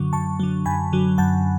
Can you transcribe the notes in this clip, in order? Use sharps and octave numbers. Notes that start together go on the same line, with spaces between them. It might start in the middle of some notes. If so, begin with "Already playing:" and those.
Already playing: F#2 D3 F#3 C#6
F#2 A5 C#6
D3 F#3
F#2 G#5 B5
D3 F#3
F#2 F#5 A5